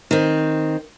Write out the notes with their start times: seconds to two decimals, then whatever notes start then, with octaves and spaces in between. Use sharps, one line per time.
0.11 D#3 C4